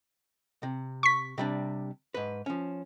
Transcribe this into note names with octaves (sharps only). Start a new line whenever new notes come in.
C3
C#6 B6
C3 G3 D4
G#2 B4
F3 C#4